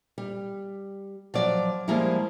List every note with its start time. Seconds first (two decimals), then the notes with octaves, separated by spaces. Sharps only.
0.18 G3
1.34 F3 F#3 D5
1.88 F3 G3 G#3 A#3 E4